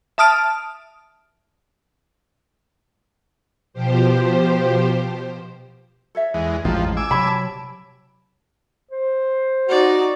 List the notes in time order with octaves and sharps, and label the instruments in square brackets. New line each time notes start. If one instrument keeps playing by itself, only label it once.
[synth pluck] E5 A5 D#6 F6 D7
[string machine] B2 F3 G4 C5
[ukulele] A4 C#5 E5
[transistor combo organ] E2 G#3
[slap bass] A1 G#3 [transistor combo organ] F2 F3 [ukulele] F4 G#4 A#5
[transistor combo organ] G#5 D6 E6
[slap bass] C3 F#3 [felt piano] B5
[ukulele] A5
[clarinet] C5
[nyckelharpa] D#4 D5 [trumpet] F#4